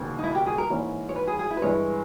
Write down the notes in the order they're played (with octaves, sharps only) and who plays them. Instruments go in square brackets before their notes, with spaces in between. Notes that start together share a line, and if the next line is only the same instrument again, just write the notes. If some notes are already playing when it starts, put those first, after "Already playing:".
Already playing: [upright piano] E1 D#2 C#3
[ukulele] D#4
E4
G4
G#4
A#4
[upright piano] G#2 E3 A#3 C#4 E4
[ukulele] C#5
B4
G#4
G#4
E4
B4
[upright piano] G2 E3 G#3 C#4 E4 [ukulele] C#5